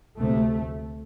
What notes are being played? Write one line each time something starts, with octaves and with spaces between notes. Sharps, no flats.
D2 C3 A3